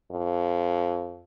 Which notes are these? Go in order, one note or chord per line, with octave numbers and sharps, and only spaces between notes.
F2